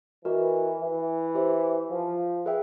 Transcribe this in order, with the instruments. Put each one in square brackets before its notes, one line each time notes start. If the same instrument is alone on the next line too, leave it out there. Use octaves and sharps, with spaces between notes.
[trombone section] E3 [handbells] F#4 A#4 D#5
[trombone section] E3
[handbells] G4 C5 E5
[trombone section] F3
[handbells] G#4 B4 E5 G5